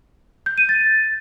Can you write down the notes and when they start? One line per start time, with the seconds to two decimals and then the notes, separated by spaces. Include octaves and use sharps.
0.46 G6
0.58 D#7
0.69 A6